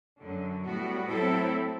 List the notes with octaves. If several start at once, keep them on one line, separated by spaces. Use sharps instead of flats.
F#2 D3 F#3
A2 G3 B3 F#4
A2 F#3 C4 E4 A4